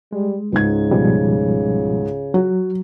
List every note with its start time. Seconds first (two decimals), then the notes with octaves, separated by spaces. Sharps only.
0.13 G3 G#3
0.52 C#2 G#2 C#3 G#6
0.91 B2 F3 G3
2.34 F#3 F#4